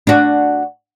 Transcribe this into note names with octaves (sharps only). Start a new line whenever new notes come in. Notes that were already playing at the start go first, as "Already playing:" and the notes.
D4 F#4